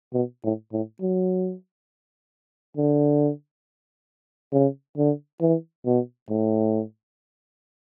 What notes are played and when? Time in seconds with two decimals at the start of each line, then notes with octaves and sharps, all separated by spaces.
0.14 B2
0.44 A2
0.72 A2
1.01 F#3
2.77 D3
4.53 C#3
4.98 D3
5.41 E3
5.86 B2
6.29 A2